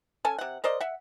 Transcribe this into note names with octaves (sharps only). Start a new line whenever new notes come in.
C#4 A4 G#5
C3 F#5
A#4 C5 D5 D#5
E5 F#5